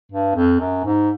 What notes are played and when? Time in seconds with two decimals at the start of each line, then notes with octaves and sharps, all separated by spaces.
0.12 G2
0.35 F2
0.60 F#2
0.84 G#2